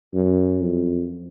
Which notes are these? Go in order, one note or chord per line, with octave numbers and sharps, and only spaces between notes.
F#2
F2